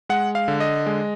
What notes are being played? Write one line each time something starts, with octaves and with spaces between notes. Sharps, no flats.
G#3 F#5
F5
D3
D#5
G#3